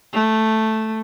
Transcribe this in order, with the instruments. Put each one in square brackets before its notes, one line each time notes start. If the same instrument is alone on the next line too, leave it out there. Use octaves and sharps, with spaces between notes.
[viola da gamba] A3